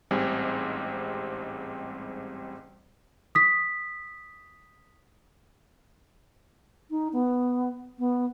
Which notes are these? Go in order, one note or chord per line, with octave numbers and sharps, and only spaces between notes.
A1 G#2 G3 C4 G#5
D#6 B6
D#4
B3
B3